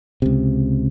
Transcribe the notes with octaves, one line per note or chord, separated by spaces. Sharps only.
C#2 C3